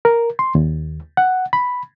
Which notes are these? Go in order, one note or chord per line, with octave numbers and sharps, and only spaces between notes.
A#4
C6
D#2
F#5
B5